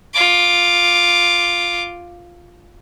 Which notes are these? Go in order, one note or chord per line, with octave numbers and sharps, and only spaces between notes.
F4 D6